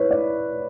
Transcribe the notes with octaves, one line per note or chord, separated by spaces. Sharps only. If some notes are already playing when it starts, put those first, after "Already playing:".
Already playing: E4 B4 C#5
D5